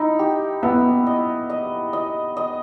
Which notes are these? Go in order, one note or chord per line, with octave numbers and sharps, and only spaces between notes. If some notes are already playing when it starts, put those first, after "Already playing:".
Already playing: D#4 E4
G4
B3 E4
D#5
D#5
D#5
D#5